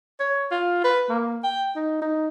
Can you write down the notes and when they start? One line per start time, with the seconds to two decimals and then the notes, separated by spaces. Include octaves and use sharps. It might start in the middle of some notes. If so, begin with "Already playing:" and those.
0.20 C#5
0.51 F4
0.84 B4
1.09 A#3
1.44 G5
1.76 D#4
2.01 D#4